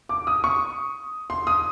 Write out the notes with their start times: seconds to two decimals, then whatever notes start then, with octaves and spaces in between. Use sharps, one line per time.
0.09 D6
0.27 D#6
0.44 C#6
1.30 C6
1.47 D#6